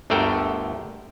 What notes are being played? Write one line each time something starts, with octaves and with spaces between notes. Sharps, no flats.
G1 D2 A3 A4 A#4 G5